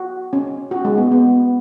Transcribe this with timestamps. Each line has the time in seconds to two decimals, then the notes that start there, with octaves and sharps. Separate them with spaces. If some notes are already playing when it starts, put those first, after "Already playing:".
Already playing: F#4
0.33 C#4
0.71 F#4
0.85 G#3
0.98 B3
1.12 B3